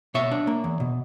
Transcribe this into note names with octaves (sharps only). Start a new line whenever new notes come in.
B2 C#5 E5
D4
A#3
E2
B2